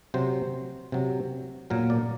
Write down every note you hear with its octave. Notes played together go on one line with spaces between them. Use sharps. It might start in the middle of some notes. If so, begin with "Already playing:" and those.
C3 F#3 C5
C3 F#3
A#2 F#3 A#4
D5